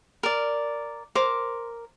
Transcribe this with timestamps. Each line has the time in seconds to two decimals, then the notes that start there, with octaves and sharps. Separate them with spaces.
0.23 A#4 D5
1.15 A#4 C5 D6